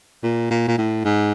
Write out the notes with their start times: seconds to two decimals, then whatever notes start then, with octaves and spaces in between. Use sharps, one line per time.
0.23 A#2
0.50 A#2
0.68 A#2
0.78 A2
1.05 G#2